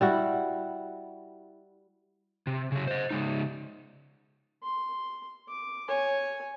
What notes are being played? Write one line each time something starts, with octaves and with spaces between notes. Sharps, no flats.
G3 E4 F#4
C3
C#3 F#3
C5 D#5
C#3 G#3 D#4
C6
D6
C#5 G#5